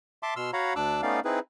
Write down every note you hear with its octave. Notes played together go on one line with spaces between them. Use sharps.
E5 A5 C6 D6
B2 C6 E6 F6
F#4 C#5 F5 F#5 A#5 B5
D2 D4 D6 E6 F#6
A3 B3 C#4 D#4 D5 F5
C4 D#4 E4 G#4 B4